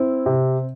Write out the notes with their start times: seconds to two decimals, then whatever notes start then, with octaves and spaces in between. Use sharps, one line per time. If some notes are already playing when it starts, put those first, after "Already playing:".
Already playing: C4 E4
0.26 C3